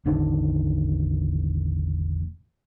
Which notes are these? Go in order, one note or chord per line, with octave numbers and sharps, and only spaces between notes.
E1 A1 D3 D#3